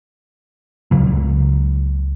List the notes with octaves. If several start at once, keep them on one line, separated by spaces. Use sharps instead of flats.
C#2 C#3 F#3